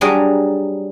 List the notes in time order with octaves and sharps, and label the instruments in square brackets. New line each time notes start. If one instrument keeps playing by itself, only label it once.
[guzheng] F#3 G3 D4 G#4 A#4